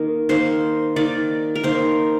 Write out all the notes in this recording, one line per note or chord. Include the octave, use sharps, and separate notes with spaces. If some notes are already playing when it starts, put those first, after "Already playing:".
Already playing: D#3 A#3 A#4
D#3 A#3 C5
D#3 A#3 D5
A#4
D#3 A#3 C5